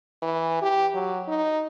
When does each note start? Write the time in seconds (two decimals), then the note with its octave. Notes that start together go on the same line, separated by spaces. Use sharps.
0.23 E3
0.62 G4
0.94 F#3
1.28 D#4